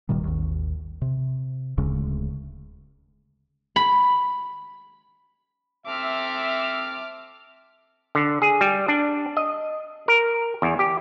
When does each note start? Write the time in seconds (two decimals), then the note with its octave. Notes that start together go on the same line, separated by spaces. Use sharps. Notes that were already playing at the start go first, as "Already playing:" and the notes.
0.09 D1 A#2 D#3 G3
0.24 G#1 D#2
1.02 C3
1.77 D1 D2 C#3 G#3
3.76 B5
5.87 C4 A4 E5 D6 F6
8.15 D3
8.42 G#4
8.61 G3
8.88 D4
9.37 D#5
10.08 A#4
10.62 E2
10.79 G4